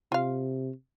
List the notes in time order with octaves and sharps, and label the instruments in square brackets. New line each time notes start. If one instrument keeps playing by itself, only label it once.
[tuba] C3 [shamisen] F4 F5